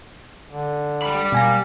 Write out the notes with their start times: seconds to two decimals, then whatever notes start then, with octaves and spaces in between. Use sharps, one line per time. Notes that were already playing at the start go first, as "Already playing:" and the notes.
0.49 D3
1.02 G3 B5
1.32 B2 A#3 G#5 A#6